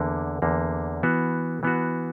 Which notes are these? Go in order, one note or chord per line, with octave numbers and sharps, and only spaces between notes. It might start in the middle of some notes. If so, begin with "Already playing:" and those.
Already playing: E2 D3 A#3
E2 D3 A#3
E3 B3 F#4
E3 B3 F#4